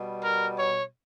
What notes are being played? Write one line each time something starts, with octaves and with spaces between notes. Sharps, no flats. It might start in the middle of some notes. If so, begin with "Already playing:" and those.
Already playing: B2 G3
A#4
C#5